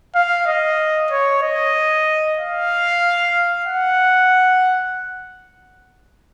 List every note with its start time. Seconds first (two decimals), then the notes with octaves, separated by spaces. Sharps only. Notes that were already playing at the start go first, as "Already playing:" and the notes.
0.15 F5
0.47 D#5
1.11 C#5
1.43 D#5
2.38 F5
3.66 F#5